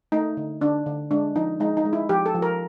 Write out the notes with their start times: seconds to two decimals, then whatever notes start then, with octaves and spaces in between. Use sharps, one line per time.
0.12 A3 D#4
0.37 D3
0.61 D3 D4
0.86 D3
1.11 G#3 D4
1.36 F3 D#4
1.60 G#3 D#4
1.77 D#4
1.85 G#3
1.93 E4
2.09 F3 G4
2.26 A4
2.35 F3
2.42 A#4